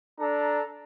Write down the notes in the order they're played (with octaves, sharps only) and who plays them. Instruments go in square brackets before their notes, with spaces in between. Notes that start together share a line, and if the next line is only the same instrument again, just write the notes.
[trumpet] D4 [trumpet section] A4 A#5